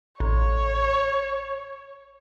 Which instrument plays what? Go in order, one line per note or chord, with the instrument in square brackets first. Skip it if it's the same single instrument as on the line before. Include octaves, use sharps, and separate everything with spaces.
[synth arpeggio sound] A1 [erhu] C#5